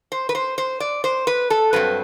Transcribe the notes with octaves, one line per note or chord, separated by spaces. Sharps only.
C5
B4
C5
C5
D5
C5
B4
A4
G2 F#3 C4 B4